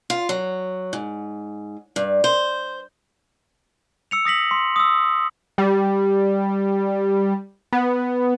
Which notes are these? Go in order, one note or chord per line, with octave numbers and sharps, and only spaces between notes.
F4
F#3
G#2
G2
C5
E6 C#7 F7
D#6 A#6 B6 F#7
C6
D#6 E6
G3
B3